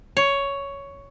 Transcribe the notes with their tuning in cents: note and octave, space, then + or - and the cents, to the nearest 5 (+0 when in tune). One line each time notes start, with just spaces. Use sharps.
C#5 +10